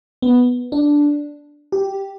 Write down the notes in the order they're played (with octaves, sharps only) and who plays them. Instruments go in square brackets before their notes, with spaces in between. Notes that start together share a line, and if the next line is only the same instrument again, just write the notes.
[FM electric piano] B3
D4
G4